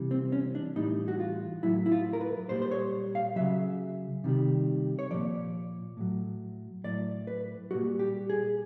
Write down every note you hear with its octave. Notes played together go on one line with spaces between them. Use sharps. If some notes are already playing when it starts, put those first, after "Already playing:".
Already playing: C3 E3 G3
C4
C#4
D4
A2 E3 G3 D#4
F#4
F4
A2 F#3 E4
E4
F4
A#4
B4
A#2 G3 C5
C5
C#5
F5
C#3 F#3 E5
C3 D#3 G3
C#5
A#2 F3 D5
A2 F#3
A2 F#3 D5
B4
A#2 G3 F#4
G4
G#4